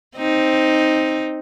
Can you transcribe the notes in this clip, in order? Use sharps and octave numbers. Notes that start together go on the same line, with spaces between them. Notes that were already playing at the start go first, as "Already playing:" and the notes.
C4 D#4